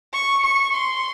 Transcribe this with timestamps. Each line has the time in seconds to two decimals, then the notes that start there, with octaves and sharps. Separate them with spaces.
0.13 C#6
0.43 C#6
0.73 C6